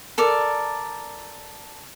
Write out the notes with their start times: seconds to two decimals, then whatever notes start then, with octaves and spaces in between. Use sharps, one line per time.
0.18 A4 A#4 D5